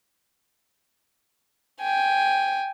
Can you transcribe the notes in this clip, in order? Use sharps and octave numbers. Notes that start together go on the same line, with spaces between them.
G5 G#5